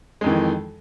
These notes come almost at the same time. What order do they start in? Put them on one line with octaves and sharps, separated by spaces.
G#3 F2 D#3 E3